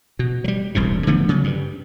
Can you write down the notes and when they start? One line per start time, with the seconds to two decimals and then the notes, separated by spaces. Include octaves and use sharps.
0.19 B2
0.44 F#3 G3
0.75 E1 C2 A2 C3
1.07 D3 F3 A3 B3
1.29 C#3 F#3
1.44 G2